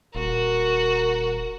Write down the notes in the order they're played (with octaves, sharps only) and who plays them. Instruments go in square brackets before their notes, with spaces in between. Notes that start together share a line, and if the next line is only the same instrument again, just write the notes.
[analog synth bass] D#1 [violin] F#4 [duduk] A#4